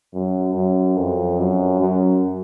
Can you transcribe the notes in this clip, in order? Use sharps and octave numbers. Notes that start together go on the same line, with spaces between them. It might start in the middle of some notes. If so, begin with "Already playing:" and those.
F#2
F#2
F2
F#2
F#2